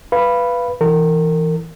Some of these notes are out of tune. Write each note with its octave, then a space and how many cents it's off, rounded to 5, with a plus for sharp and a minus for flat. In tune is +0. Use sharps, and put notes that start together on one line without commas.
B4 +0 F5 -20 B5 +0
E3 +0 A#4 -30